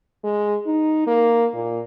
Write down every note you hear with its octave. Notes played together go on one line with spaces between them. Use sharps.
G#3
D#4
A#3
A#2